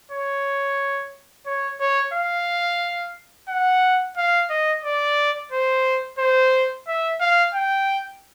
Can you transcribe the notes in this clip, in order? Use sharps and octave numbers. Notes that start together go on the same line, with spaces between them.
C#5
C#5
C#5
F5
F#5
F5
D#5
D5
C5
C5
E5
F5
G5